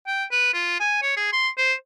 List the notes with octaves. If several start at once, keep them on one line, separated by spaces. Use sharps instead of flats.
G5
B4
F4
G#5
C#5
G#4
C6
C5